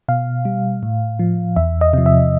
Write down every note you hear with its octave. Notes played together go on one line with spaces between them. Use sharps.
B2 F5
G3
A2
F3
E2 E5
D#5
C3 F3
E5